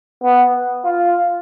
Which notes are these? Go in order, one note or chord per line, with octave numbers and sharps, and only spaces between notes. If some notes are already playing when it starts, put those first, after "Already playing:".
B3
F4